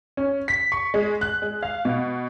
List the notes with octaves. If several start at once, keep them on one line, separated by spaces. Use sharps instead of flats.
C#4
B6
C#6
G#3
F#6
G#3
F5
B2